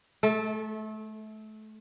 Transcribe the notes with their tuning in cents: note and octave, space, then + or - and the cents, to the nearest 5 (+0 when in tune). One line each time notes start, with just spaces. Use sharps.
A3 -25 A4 +0